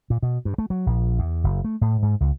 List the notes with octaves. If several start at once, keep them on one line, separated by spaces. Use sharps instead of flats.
A#2
B2
G2
A3
F#3
A#1
E2
F#1
A3
A2
G#2
C#2